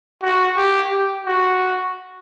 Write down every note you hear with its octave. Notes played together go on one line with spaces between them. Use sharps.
F#4
G4
G4
F#4